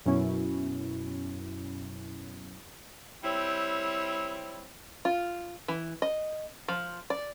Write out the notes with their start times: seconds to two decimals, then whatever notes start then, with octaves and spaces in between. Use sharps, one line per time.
0.06 F#2 B2 C#4 E4
3.23 G3 C4 E4 C#5
5.05 F4
5.68 E3
6.02 D#5
6.68 F3
7.10 D5